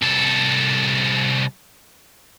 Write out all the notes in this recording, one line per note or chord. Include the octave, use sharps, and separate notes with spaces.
C2 A4